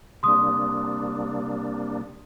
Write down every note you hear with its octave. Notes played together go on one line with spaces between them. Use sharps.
C3 G3 A#3 D4 C6 D#6